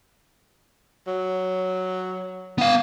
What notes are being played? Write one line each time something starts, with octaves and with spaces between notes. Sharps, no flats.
F#3
B3 F5